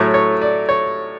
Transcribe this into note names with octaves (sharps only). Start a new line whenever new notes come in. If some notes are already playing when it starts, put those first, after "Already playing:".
Already playing: A2 F#3 A3 C#5
C#5
D5
C#5